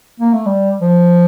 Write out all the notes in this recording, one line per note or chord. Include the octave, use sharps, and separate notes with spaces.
A#3
A3
G3
F3